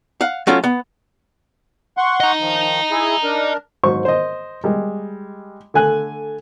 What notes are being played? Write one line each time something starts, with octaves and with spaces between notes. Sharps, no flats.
F5 F#5
F#3 A3 C#4 F4
B3
F#5 C6 C#6
D#5 A#5
D#3 F3
E4 G#4
D4 A#4
G#2 F#3 C5 C#6
C5 D#5
G3 G#3
D3 A3 G#5 F#6